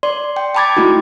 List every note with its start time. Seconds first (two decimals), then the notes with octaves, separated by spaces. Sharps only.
0.03 D5 C6
0.36 G5
0.55 G5 A5 B5 D6 G#6 A6
0.77 A3 D#4 E4 F#4